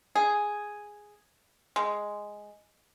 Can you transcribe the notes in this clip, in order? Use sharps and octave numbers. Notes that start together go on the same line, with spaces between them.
G#4
G#3